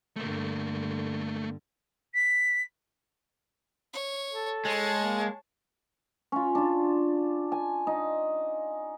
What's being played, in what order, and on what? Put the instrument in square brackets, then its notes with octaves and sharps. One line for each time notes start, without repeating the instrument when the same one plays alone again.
[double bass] G2 D3 [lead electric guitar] A3 A#3
[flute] B6
[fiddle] C#5
[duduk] A4
[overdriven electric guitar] G#3 [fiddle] C#5 A5
[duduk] A#3
[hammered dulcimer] C#4 F4
D4 F4
G#5
D#4